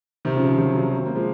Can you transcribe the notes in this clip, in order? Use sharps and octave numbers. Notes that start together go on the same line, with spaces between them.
C3 D#3
C#3 F3
C#3 F3
D#3 F#3
D#3 F#3
C#4
C4
A#3
F3 G#3